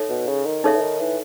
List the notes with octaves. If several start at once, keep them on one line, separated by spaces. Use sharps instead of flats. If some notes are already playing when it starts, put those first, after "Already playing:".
Already playing: D#4 A4 C#5 E5
B2
C#3
D#3
C#3 D#4 A4 C#5 E5
E3
D#3
E3